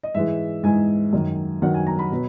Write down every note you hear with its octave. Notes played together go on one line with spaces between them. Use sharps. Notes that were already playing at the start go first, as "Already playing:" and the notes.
D#5
G#2 E3 G#3 E5
G#2 E3 G#3 G#5
F#2 D#3 F#3
F#2 D#3 F#3 F#5
G#5
A#5
B5
B2 F#3